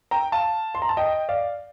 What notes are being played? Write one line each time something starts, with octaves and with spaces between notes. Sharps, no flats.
G5 A#5
F5 A5
C6
A#5
A5
D#5 G5
D5 F5